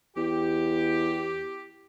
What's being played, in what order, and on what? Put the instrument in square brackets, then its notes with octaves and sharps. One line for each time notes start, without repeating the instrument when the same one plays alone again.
[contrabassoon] E2 [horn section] G4